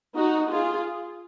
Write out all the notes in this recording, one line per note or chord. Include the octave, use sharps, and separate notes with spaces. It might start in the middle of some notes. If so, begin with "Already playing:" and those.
D#4 F#4
F4 G#4